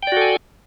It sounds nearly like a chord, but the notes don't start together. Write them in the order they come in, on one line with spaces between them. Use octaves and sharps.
G5 D5 F#4 A4 G#5